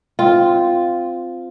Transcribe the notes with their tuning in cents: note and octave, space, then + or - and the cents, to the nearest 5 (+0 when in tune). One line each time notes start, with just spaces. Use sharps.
C4 -10 F4 +0